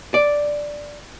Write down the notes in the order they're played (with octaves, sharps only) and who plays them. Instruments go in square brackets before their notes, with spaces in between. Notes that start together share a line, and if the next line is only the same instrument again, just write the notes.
[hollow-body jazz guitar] D5